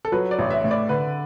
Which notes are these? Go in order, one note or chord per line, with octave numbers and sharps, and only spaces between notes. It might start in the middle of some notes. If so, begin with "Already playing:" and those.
A4
F#3 B4
D5
A1
E5
A2
D5
D3 B4